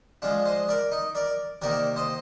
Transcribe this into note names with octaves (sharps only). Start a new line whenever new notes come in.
F3 G#3 D4 F4
C5 D#5
A#4 D5
D#4
A#4 D5
C3 D#3 A#3 D#4 A#4 D5
C5 D#5